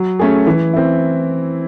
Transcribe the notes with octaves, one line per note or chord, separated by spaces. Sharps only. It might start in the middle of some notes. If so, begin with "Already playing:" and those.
Already playing: F#3
A3 C#4 G#4
E3
C4 E4